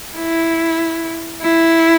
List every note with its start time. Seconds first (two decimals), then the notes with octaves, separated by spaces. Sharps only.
0.16 E4
1.42 E4